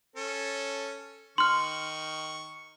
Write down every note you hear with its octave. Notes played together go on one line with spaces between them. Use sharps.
C#4 A4
D#3 C6 C#6 F6